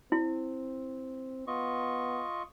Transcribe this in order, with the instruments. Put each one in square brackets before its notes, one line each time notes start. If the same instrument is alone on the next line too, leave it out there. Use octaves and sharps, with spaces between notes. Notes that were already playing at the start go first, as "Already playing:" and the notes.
[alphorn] C4 [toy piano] E4
[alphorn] B3 [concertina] F4 D#5 C#6